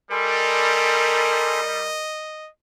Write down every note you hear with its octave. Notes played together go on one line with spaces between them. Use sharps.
G3 A4 A#4 D#5 G#5 C6